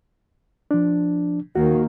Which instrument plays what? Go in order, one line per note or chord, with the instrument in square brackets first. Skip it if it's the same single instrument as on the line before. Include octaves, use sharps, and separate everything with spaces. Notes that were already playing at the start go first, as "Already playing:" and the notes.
[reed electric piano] F3 D4
[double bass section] D#2 D#3 A#3 [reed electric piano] F#4